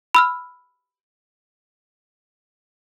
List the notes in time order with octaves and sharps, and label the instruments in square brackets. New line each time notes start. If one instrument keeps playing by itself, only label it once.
[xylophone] B5 E6 F6